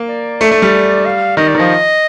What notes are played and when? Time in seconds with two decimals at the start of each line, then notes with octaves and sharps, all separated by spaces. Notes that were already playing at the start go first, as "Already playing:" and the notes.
Already playing: A#3
0.09 D5
0.41 A3
0.51 A3
0.62 G3
1.05 F5
1.37 D#3 D#5
1.48 D5
1.55 D#3
1.59 F3 D#5